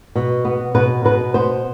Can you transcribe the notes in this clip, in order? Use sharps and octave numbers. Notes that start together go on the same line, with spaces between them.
B2
B3
B2 B4
B2 B4
B3 C5